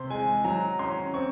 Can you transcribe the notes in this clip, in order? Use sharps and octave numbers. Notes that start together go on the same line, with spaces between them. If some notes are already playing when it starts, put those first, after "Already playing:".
Already playing: C3 C6
G#3 G#5
F#3 A#5
C#4 C6
C4 C#6